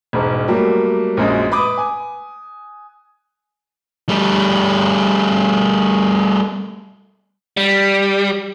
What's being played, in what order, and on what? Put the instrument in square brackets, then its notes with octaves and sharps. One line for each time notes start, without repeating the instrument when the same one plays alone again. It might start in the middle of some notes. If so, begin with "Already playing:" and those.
[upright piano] E1 G#2
F#3 G3 A3 A#3
A#1 F#2 G#3
B4 B5 D6 D#6
G#5
[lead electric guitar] G3 A3
G3